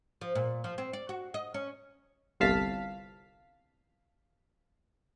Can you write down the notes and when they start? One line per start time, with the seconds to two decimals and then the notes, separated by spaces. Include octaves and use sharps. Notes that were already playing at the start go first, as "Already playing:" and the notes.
0.21 F3
0.35 A#2
0.64 F3
0.78 C4
0.93 D5
1.09 F#4
1.34 D#5
1.54 C#4
2.40 G1 C2 F5 A5 B6